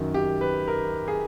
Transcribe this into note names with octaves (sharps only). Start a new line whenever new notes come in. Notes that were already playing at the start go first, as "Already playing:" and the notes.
Already playing: F#2 D#3 F#3
G4
B4
A#4
G#4